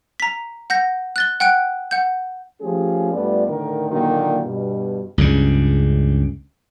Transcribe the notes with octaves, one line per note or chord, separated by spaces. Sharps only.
A#5 B6
F#5 G6 A#6
F#6 A6 G7
F#5 G5 F#6 D7
F#5 G6
F3 A3 C#4 G4 G#4
G2 A3 B3 F4 D5
A2 D3 D#3 A#4
A#2 D3 D#3 F#3 A#3
G2 B2
C#2 G2 C#3